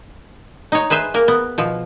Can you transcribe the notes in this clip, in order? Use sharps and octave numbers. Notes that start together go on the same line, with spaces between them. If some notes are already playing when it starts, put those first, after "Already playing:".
D#4 C#5
G#4 B4 C5 E5
A#3 A#4
B3
B2 F3